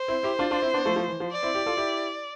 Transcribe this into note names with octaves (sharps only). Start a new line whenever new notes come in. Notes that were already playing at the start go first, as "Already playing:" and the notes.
Already playing: C5
C4 E4
E4 G4
D4 F4
D4 F4
C4 E4
B3 D4
F3 A3
F3 A3
E3
F3
D5
C4 E4
E4 G4
F4 A4
E4 G4